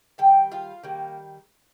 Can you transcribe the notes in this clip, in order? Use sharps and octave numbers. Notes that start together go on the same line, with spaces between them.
D#3 G3 G5
F4 F5
D#3 G3 A#3